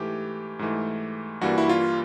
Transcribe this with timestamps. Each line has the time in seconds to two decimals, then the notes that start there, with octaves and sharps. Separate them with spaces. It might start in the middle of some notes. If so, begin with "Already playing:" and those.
Already playing: G#2 E3 A3 G4
0.59 G#2 E3 A3
1.41 G2 E3 G3 A#3 F#4
1.58 E4
1.69 F4